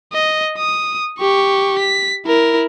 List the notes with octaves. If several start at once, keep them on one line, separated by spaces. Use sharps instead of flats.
D#5
D#6
G4 C#6
B6
E4 A#4